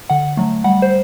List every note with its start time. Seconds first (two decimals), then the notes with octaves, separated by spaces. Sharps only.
0.10 D3 F#5
0.37 F#3 A3
0.64 G3 F#5
0.82 C5